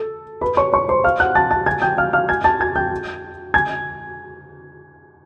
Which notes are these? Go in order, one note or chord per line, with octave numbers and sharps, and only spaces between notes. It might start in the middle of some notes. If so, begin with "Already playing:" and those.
Already playing: A4
B4 B5
C#5 C#6
C#5 C#6
C5 C6
F5 F6
F#5 F#6
A5 A6
A5 A6
G#5 G#6
G5 G6
F5 F6
F5 F6
G#5 G#6
A5 A6
G#5 G#6
G5 G6
G#5 G#6